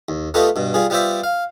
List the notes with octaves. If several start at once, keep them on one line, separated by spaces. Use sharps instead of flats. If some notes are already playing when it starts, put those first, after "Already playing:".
D#2
A3 B3 F4 G4 B4 D#5
G2 B2
G3 F4 G#4
G3 B3 F4 C5 D5 E5
F5